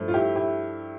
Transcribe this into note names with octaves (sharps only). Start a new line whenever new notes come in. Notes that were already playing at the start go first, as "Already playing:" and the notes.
Already playing: G2 F3 A3
F4
E4 G4
E4 G4